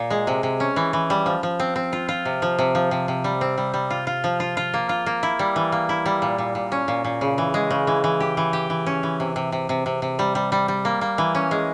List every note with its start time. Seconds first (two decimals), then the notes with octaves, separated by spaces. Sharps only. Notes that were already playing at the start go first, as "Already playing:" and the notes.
Already playing: A#2
0.10 G#3
0.27 C3
0.43 C3
0.60 C#4
0.76 E3
0.93 E3
1.10 G3
1.26 F3
1.43 F3
1.59 C4
1.76 C4
1.93 F4
2.09 F4
2.25 C3
2.42 F3
2.59 C3
2.75 F3
2.91 C3
3.08 C3
3.24 G3
3.41 C4
3.58 G3
3.74 G3
3.90 F4
4.07 F4
4.24 F3
4.40 F4
4.57 F4
4.74 A#3
4.89 F4
5.06 A#3
5.23 E4
5.39 G3
5.56 E3
5.72 A#3
5.89 E4
6.06 G3
6.22 A#2
6.38 A#2
6.55 A#2
6.72 C#4
6.88 A#2
7.04 A#2
7.21 C#3
7.38 E3
7.54 G#3
7.71 C#3
7.87 E3
8.04 E3
8.20 G4
8.37 E3
8.53 G4
8.70 E3
8.86 C#4
9.03 E3
9.20 C3
9.36 C3
9.52 C3
9.69 C3
9.86 C3
10.02 C3
10.19 G3
10.35 G3
10.52 G3
10.68 G3
10.85 A#3
11.01 A#3
11.18 E3
11.35 C#4
11.51 G#3